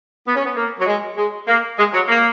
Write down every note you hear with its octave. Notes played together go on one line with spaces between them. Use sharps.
B3
C#4
B3
A#3
F#3
G#3
G#3
A#3
G#3
F#3
A#3